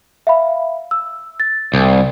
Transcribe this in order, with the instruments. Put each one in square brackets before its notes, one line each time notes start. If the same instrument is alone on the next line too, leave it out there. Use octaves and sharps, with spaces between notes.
[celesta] E5 F5 B5
E6
A6
[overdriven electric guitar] C2